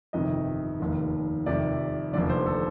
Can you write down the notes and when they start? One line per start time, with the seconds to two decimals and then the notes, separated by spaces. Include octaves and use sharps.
0.13 G1 F2 C3 D#3 D#5
0.80 F1 D#2 D#3
1.46 F1 F2 C3 D#3 D5
2.13 F1 D#2 D3 D5
2.30 C5
2.46 A4